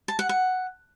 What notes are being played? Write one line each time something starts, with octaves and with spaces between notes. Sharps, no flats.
A5
F#5
F#5